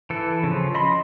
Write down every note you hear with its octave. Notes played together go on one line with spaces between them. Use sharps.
E3 A4
C#3 F3
D#5 B5 C6